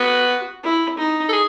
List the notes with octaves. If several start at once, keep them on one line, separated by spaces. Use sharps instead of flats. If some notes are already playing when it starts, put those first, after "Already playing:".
Already playing: B3 F#4
E4
D#4
A4
G#4